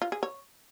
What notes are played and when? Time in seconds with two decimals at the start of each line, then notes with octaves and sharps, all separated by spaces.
0.02 F4
0.12 G#4
0.23 C#5